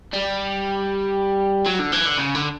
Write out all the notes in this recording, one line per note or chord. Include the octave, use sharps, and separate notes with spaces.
G3
F#3
D3
E3
D3
C#3
D3